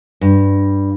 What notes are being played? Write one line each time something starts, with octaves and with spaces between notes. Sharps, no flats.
G2